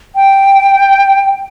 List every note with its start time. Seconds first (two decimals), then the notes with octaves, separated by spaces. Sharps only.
0.16 G5